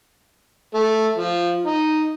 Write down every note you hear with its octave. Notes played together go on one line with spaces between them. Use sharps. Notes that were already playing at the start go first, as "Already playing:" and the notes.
A3
F3
D#4